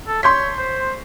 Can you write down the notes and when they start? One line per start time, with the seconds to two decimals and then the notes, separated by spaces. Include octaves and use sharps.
0.07 A4
0.23 C#5 C6 G6 B6
0.58 C5